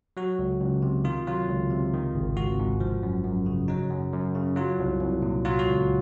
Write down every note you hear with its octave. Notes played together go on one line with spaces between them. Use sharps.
F#3 F#4
C#2
C#2
C3
D#3 F4
F#3 F4
C#2
C3
D#3
G#1
G#1 F#4
G#2
F3
F#2
F#2
C#3
F#3 D#4
F#2
F#2
C#3
F#3 F4
C2
C2
A#2
F#3 F4
F#4
C#2